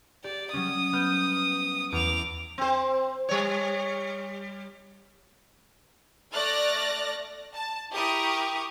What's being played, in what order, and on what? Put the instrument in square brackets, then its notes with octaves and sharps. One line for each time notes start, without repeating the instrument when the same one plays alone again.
[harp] G4 [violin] D5
[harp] F#3 G3 C#4 [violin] D#6
[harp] B3 F6 G6
[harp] E2 [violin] D6 F7
[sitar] C4 C5
G3 C#5
[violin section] A3 D5 F6 F#6 A6 A#6
A5
E4 G4 A#4 C#6 D#6